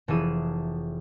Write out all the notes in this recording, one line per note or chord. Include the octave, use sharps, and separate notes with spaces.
F1 E3 F3 G#4 E6 D#7